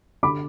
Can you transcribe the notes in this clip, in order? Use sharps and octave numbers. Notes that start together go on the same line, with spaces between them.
D3 B5 D6